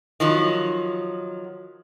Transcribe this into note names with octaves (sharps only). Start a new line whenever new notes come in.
D#3 F3 F#3